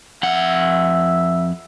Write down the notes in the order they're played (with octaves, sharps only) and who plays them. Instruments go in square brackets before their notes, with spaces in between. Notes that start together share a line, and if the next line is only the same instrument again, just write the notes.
[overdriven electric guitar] F2 F#5 [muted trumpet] E5